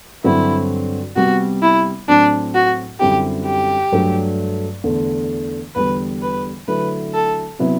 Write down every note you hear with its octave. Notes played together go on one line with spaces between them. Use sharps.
G2 D3 F#3 C4 E4 F#4
C3 G3 B3 F#4
E4
A2 F#3 C4 D4
F#4
F#2 D3 G3 C4 E4 G4
G4
G2 F#3 A3 D4 A4
E2 D3 A3
E2 D3 G3 B4
B4
D3 F#3 A3 E4 B4
A4
C3 F#3 B3 E4